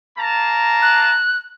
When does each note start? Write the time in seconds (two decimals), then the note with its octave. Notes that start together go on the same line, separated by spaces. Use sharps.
0.18 A#3 A5 A#5
0.82 F#6